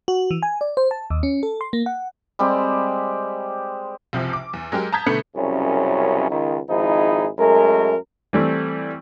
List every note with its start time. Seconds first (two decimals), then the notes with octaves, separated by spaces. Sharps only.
0.08 F#4
0.31 E3
0.43 G#5
0.61 D5
0.77 C5
0.91 A5
1.10 D#2
1.23 C#4
1.43 A4
1.61 C6
1.73 A#3
1.86 F#5
2.39 G3 G#3 C4 G4
4.13 F#1 C2 C3 F3
4.33 D6
4.53 E2
4.72 F#3 G#3 G4 A#4
4.93 A5 A#5 D#6 G6 G#6 B6
5.06 B2 D3 A3 B3 B4 C#7
5.36 C2 F#2 C#3 C#4
6.30 C#2 D#3
6.69 G#1 F3 D#4 E4 G#4
7.39 F#2 G#3 A3 A#4
8.33 E3 G3 A3 C4